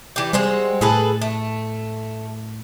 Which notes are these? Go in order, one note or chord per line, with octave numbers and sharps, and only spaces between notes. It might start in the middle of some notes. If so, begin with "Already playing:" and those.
E3 G3 G4
G3 G#3 C4 F#4
A2 G#4 A4 B4
A3